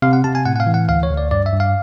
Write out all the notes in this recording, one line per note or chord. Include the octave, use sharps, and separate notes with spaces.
C3 F5
F#5
C3 A5
G#5
A2 F#5
F#5
F5
E3
F#5
D2 F5
C#5
D2
D5
G2 D5
E5
G2
F5